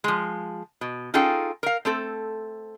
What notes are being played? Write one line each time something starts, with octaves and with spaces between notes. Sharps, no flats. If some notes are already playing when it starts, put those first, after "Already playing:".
F3 G#3
B2
C#4 D#4 F4 G#4 A4 G5
A#4 F5
A3 C4 A4